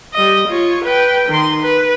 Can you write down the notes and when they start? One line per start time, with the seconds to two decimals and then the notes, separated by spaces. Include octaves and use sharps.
0.14 G3 D#5
0.48 F4 C#5
0.84 B4 G5
1.29 D#3 C6
1.63 B4